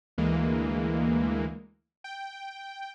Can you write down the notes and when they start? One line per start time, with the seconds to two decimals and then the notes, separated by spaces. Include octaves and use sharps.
0.18 D2 E3 G#3 A#3
2.04 G5